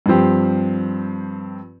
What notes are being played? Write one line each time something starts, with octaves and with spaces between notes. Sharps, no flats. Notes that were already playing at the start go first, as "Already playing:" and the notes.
G2 F3 C4 G4